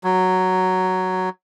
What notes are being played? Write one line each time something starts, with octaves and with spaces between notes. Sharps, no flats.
F#3